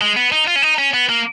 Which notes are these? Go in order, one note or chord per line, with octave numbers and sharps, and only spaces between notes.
G#3
B3
D#4
F4
C#4
D#4
C#4
B3
A#3